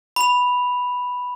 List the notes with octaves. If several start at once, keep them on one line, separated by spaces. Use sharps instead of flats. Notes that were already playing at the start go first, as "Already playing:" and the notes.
B5 F7